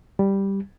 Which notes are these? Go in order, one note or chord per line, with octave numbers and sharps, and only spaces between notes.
G3